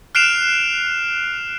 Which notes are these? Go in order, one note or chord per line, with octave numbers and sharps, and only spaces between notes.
F6 F#6 C7 D7 E7 F7